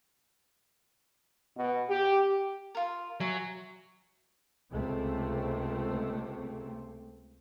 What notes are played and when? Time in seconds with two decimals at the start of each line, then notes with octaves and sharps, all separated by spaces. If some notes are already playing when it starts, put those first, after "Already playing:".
1.58 B2
1.89 G4
2.75 F4 A#4
3.20 F#3 E5 G#5
4.72 C#2 C3 A3 C4